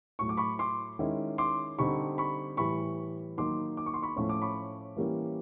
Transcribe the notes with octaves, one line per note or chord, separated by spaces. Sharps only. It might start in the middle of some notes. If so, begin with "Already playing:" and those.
A2 F#3 A3 C#6
D6
B5 C#6
C6 D6
D#3 G#3 C#4 E4
C6 D6
D3 G3 C4 D#4 B5 C#6
B5 C#6
A2 E3 G3 B5 C#6
D#3 F#3 A#3 D#4 C6 D6
D6
C#6
C6
B5 C#6
A2 F3 A3 C#4 C#6
D6
B5 C#6
E3 G3 A#3 C#4 E4